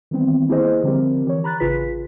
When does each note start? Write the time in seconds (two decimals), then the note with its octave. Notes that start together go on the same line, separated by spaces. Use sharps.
0.11 D#3 E3 G3 B3 C4
0.48 A#3 E4 G4 G#4 C5 D#5
0.83 D3 F3 G3 C4 G4 A#4
1.25 E3 G4 C#5
1.44 A#5 B5 F#6 A6
1.60 A1 C#3 F4 G#4 B4 B6